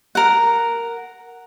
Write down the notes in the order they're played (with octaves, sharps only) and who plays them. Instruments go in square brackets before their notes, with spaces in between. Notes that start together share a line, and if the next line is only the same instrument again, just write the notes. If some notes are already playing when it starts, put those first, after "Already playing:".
[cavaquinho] A#4 F#5